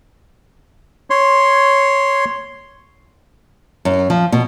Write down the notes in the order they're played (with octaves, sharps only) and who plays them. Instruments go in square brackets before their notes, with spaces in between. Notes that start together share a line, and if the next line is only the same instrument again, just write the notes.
[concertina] C#5 C6
[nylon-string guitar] F#2
F3
B2